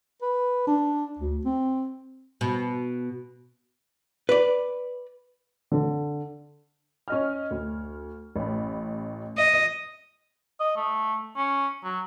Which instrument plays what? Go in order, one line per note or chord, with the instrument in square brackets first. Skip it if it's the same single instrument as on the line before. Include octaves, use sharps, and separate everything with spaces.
[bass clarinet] B4
D4
D2
C4
[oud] B2
[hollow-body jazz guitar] B4 D5
[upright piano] D3
[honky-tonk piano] C#4 D#5 F6
D2
A1 B5
[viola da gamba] D#5
[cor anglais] D#5
A3
C#4
F#3